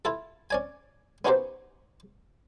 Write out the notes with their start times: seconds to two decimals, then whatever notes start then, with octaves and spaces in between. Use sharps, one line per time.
0.05 E4 F4 A4
0.51 C#4 D5 G#5
1.25 B3 C#4 D#4 F#4 G4 C5